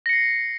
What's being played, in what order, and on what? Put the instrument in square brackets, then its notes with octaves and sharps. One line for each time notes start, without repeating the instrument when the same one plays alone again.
[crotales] A#6
C#7
C7